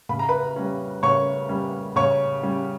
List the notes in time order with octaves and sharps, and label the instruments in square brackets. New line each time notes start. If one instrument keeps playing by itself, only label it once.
[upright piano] C#3 B5
A#5
B4 B5
G3 C#4
C#3 C#5 C#6
G3 C#4
C#3 C#5 C#6
G3 C#4